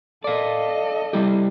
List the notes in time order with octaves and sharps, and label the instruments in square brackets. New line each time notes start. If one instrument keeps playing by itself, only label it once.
[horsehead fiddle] A4 D#5 [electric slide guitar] D5 F5
[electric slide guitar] G3 E4 G4